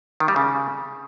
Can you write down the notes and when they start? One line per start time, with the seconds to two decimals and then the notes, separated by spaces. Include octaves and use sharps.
0.20 D#3
0.28 G3
0.36 C#3